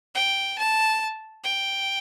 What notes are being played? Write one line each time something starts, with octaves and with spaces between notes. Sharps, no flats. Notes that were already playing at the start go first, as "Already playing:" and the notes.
G5
A5
G5